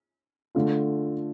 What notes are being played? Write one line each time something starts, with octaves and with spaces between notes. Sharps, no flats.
D3 A3 F4